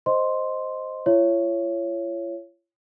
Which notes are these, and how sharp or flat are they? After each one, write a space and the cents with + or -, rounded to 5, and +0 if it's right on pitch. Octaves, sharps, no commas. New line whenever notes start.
C5 +0 D#5 +0 C6 +0
F4 -45 C#5 +0 E5 +35